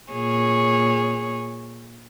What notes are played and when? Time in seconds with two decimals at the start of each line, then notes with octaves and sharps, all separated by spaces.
0.12 A#2 G#4 C#5